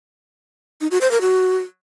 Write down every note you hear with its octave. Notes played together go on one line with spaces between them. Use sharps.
D#4
F#4
C5
A#4
F#4